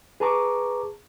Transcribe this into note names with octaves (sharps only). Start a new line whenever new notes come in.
G#4 B4 A5 A#5 C#6 D6